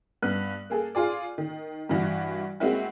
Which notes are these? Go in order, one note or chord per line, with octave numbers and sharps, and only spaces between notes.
G2 B3 F#6
A#3 G#4 A4
F4 G#4 D5
D#3
G2 E3 F#4
G#3 A#3 C4 E4 F#4